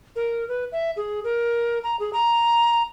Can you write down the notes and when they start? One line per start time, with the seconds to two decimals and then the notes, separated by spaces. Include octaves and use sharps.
0.16 A#4
0.48 B4
0.72 E5
0.96 G#4
1.24 A#4
1.84 A#5
2.00 G#4
2.13 A#5